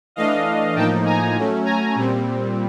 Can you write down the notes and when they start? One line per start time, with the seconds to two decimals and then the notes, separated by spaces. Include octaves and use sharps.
0.16 E3 A3 D4 D#5 F5
0.75 A2 F3 A#3 D#4 G5 A5
1.05 G#5 A#5
1.36 F#3 A3 C#4
1.65 G#5 A#5
1.95 A#2 G3 C4